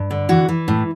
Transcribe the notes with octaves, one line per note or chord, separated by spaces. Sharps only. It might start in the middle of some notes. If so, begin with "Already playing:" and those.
Already playing: G2
D3
E3 F#4
E3
A2